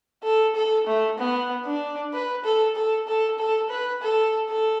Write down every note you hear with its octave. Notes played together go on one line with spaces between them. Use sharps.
A4
A4
A3
B3
D4
B4
A4
A4
A4
A4
B4
A4
A4